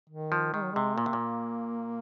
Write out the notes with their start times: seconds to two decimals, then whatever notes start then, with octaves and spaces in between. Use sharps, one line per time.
0.10 D#3
0.32 F3
0.54 D#3 G#3
0.63 F#3
0.72 C3 G#3
0.97 A#2 A#3
1.06 C3
1.13 A#2